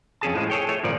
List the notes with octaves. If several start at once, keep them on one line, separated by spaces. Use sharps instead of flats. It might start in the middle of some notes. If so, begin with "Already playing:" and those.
F2 C#4 G#4 A5
A2 F3 G#3
G#4 A4 C#5 G5
A3 C#5
G#1 A#2 F3 D5